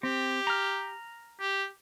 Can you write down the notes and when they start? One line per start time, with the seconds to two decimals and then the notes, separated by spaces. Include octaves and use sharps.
0.03 C4 G4
0.47 A#5 F6
1.40 G4